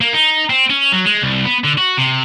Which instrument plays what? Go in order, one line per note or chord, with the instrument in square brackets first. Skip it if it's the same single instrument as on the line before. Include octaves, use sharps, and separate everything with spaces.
[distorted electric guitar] A#3
D#4
C4
C#4
F#3
G#3
C2
B3
D3
F#4
C3